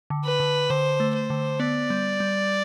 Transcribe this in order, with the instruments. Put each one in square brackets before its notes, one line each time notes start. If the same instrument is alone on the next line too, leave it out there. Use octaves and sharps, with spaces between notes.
[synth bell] D3
[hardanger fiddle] B4
[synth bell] D3
[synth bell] D3 [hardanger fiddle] C5
[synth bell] A3
[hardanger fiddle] C5
[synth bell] D3
[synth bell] B3 [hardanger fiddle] D5
[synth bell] G3
G3